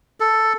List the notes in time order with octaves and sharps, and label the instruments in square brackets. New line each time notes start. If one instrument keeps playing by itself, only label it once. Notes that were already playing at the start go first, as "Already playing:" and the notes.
[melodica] A4